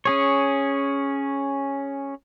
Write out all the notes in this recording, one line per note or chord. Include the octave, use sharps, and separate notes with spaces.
C#4 G#4 C#5